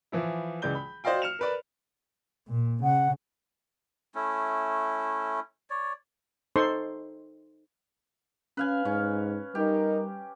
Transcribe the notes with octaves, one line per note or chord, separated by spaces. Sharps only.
E3 F3 E4
C#2 E3 G#3 D5 G6 G7
B5
F#4 C5 D5 D#5 F5 G5
F6 C#7 E7 F7
A#4 B4 D5
A#2
C#3 F#5
A3 C#4 E4
C#5 D5
D#4 A4 C5 C6 C#6
C#4 B4 F5 G#5
G#2 C#4
G3 D#4 G4 A#4